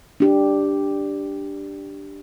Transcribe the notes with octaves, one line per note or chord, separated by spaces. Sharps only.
D4 G4